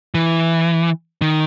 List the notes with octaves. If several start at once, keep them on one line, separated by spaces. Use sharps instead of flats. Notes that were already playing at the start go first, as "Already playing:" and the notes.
E3
D#3